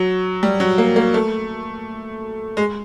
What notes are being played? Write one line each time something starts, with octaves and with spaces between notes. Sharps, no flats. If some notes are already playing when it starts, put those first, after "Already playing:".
Already playing: F#3
G3
F#3
A#3
A#3
A3
G#3